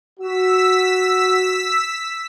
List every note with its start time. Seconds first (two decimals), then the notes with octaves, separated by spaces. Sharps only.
0.20 F#4 E6 B6